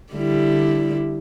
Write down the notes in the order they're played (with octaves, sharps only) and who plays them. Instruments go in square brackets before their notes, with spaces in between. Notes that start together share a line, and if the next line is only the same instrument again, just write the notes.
[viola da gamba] D3 G3 E4